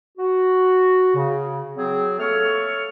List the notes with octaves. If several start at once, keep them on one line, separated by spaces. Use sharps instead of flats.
F#4
C#3
F#3 C4 G#4
A3 A#3 A4 C#5 C#6 F6